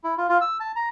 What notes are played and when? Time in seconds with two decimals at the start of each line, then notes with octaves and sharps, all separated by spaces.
0.04 E4
0.18 F4
0.29 F4
0.41 E6
0.60 A5
0.76 A#5